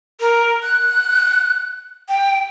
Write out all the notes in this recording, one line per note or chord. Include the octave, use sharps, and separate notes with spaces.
A#4
F#6
G5